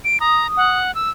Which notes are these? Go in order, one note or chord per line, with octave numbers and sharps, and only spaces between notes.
D7
A#5 D#6
F#5
E6